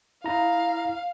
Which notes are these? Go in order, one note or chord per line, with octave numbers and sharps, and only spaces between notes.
E4 F5 A#5